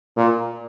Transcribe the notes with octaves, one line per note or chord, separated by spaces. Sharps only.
A#2